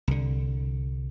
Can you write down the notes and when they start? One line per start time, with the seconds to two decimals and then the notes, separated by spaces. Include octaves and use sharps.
0.08 C2 D3